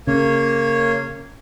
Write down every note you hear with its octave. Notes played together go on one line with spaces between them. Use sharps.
C#3 A#3 C#5